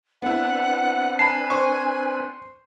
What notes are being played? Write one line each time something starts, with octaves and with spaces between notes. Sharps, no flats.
B3 C4 D4 E4 B4 F#5
G#5 A5 B5 C7
C5 C#6